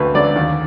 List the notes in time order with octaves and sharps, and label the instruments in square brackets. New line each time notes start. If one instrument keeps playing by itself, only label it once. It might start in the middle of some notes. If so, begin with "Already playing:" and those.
Already playing: [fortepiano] D2 D3 B4
D3 F#3 D5
D#2